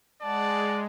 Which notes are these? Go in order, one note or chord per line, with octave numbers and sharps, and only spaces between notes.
G#3 D5 F#5 A5